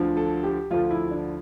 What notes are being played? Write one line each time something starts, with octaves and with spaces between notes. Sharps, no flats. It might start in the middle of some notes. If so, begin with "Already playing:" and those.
Already playing: D2 D3 F3
A4
G4
D2 D3 F3 F4
E4
D4